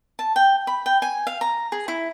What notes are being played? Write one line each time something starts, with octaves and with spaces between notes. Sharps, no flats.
A5
G5
B5
G5
G#5
F5
A#5
G#4
E4